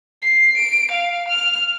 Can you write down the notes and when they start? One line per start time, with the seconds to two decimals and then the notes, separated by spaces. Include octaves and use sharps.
0.22 C7
0.57 D7
0.91 F5
1.28 F6